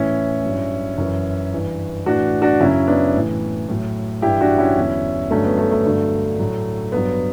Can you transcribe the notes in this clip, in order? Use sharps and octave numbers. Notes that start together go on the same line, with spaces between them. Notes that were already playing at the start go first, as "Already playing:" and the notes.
Already playing: A2 E3 C#4 E4
G2 F#3
F#2 E3
G2 E3
A2 E3 D4 F#4
D4 F#4
F#2 C#3 F#3 C#4 E4
B3 D4
A2 E3
A2 F#3
G2 E3 E4 G4
D4 F#4
C#4 E4
E2 D3 F#3
G2 D3 F#3 A3 C#4
B3
A3
A3
G2 D3 F#3
A2 F#3
G2 F#3 B3